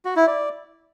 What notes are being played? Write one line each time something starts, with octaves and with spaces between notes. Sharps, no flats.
F#4
E4
D5